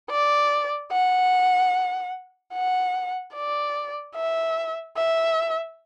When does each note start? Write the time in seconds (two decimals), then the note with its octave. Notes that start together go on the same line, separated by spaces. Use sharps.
0.11 D5
0.92 F#5
2.54 F#5
3.35 D5
4.15 E5
4.97 E5